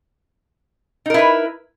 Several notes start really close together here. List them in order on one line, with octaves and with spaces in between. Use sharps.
D#4 A#4 E4 B4